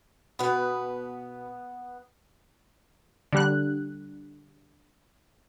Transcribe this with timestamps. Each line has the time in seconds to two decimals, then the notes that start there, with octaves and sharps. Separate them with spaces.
0.39 B2 B3 B4
3.33 D3 G3 F#6